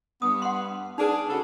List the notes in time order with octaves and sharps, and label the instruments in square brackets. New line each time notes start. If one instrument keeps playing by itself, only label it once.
[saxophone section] G2 B3 [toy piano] D#6
[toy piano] F#5 C6
[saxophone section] D4 G#4 [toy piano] D#4 B4
[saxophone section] C#3 F#4 A4